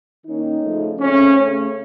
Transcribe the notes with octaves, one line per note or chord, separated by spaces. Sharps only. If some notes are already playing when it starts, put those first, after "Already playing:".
D#3 A#3 C#4 D#4
C#3 F3 A3
C#3 A3 C4 C#4
C#3 A3 C#4